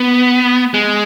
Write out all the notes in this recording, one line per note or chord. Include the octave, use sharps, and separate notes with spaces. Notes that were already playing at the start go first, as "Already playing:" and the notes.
Already playing: B3
G#3